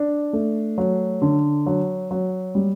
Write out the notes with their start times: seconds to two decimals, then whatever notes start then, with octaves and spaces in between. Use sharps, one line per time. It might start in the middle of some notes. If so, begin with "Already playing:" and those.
Already playing: D4
0.33 A3
0.78 F#3
1.22 D3
1.66 F#3
2.11 F#3
2.55 G3